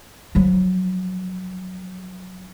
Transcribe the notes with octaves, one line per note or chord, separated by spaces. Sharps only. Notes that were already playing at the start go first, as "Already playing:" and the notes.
F3 F#3